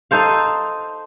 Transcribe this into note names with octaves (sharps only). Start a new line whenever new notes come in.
D#4 A4 C5 F5